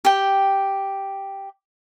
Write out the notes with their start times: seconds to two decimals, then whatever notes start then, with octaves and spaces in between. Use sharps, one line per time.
0.05 G4 G5